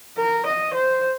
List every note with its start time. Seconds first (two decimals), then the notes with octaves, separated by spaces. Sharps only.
0.17 A#4
0.46 D#5
0.74 C5